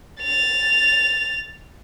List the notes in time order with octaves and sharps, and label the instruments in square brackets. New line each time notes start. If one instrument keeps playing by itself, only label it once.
[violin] A6 F7